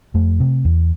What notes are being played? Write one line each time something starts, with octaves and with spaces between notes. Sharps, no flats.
F2 A3
C3
E2